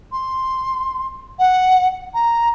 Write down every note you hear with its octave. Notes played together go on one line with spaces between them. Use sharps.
C6
F#5
A#5